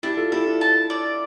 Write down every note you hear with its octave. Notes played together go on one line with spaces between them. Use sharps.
D4 E4 G4
F4 A4
E4 G4 A4
D4 F4
A5
D5